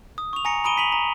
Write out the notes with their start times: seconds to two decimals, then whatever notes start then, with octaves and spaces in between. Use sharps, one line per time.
0.18 D#6
0.33 C#6 F7
0.45 G#5 A#5 A#6 C#7
0.64 A#5 B5 D#6 D7 D#7 G7
0.77 B6 D#7 F7 F#7
0.92 A#5